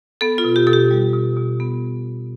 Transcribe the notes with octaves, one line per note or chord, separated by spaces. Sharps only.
B3 A4
F4
B2
G4
B2 A4
G4
G3
B2
B2
B3